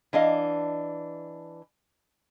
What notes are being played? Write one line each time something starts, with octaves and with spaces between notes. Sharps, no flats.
E3 D4 D#5 F5